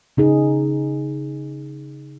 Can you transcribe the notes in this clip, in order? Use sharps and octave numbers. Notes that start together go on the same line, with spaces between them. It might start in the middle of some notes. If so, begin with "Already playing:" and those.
C#3 D#4 G#4